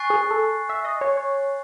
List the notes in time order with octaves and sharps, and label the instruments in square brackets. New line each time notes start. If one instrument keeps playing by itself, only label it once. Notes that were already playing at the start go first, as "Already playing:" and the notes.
Already playing: [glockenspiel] G#5 C#6 F#6 A6 C7
[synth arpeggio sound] G#4
A4
E5
D#5
C#5
C#5